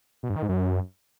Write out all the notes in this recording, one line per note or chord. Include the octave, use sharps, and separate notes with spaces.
B2
G2
D#3
G#2
F#2